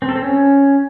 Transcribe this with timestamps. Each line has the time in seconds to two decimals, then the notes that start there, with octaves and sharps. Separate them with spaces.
0.02 C4
0.09 A4
0.16 C4
0.23 C#4